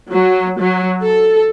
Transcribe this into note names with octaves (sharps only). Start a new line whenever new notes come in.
F#3
F#3
A4